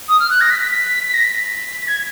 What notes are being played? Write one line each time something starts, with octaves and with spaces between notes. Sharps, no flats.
D#6
F6
F#6
A#6
B6
B6
B6
B6
A#6
B6
G#6